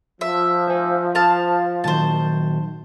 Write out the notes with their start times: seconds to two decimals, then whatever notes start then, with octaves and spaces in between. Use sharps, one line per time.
0.21 F3 E5
0.67 C5 G#5
1.15 C5 F5 A5
1.84 A#2 D#3 F#3 C5 A5